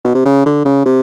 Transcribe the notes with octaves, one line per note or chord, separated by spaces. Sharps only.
B2
C3
C#3
D3
C#3
C3